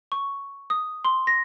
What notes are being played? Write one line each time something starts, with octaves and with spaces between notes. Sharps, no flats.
C#6
D#6
C6
A#6